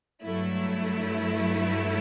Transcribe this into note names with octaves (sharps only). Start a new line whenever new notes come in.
G2 F#3 A3 E4